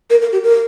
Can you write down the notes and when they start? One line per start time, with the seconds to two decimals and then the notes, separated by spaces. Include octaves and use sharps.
0.10 A#4
0.22 A#4
0.32 G4
0.44 A#4